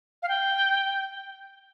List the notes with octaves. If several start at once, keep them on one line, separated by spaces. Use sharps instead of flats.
F5
G5